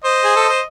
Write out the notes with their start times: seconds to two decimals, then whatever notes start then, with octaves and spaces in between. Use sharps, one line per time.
0.04 C5 D#5
0.24 G#4
0.36 A4
0.48 C5